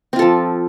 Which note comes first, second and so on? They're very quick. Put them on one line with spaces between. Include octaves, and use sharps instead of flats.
C4 F4 A4 F3